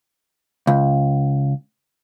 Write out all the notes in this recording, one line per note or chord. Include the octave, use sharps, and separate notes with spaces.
C#2